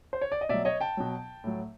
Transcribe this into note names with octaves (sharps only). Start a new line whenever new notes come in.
C5
C#5
D5
D#5
B2 F#3 D5 E5
C#5 D#5
G5 A5
B2 F#3
A2 F#3